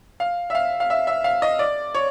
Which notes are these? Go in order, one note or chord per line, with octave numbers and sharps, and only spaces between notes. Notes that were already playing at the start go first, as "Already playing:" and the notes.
F5
E5
F5
F5
E5
E5
F5
D#5
D5
C#5